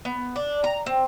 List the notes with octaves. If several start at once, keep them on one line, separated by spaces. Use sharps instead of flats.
B3
D4
A#5
C4